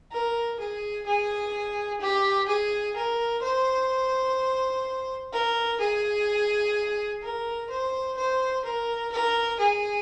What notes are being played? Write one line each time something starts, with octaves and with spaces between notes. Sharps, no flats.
A#4
G#4
G#4
G4
G#4
A#4
C5
A#4
G#4
A#4
C5
C5
A#4
A#4
G#4